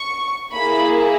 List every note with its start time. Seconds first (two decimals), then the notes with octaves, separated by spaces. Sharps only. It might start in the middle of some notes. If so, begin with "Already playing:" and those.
Already playing: C#6
0.53 A#3 E4 G#4 B5